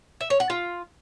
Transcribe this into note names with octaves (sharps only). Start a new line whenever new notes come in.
E5
C#5
F#5
F4